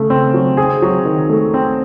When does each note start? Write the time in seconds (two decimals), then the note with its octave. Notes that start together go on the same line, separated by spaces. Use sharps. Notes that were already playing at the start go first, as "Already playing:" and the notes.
Already playing: C#3 A3
0.10 C4
0.34 F#3
0.57 C4 G#4
0.82 F#3
1.05 D#3
1.29 A3
1.54 C4